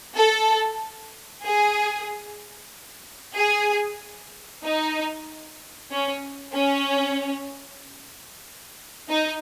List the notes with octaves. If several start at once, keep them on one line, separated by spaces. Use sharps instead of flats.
A4
G#4
G#4
D#4
C#4
C#4
D#4